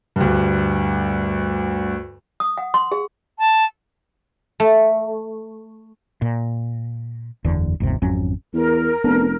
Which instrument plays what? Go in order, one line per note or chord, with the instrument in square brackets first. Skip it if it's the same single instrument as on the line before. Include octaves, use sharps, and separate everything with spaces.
[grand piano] D2 G2
[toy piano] D#6
F#5
C6
G#4
[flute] A5
[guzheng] A3
[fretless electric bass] A#2
F#1 E2 D3
G1 D#2 C3
G#1 F2 F#3 C#4
[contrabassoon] E2 [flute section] A#4
[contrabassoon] F1 [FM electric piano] B3 D4 A4